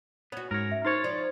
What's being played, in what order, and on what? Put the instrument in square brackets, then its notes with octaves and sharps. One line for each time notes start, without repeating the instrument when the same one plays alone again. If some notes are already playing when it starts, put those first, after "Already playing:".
[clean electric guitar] B3 [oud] C#4 F#4
[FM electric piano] G#2 A#6 [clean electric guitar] A#4 C#5
[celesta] E5
[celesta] D#4 C5 C#6 [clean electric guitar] A#4 C#5 [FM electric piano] C6 A6
[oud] F3 [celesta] D5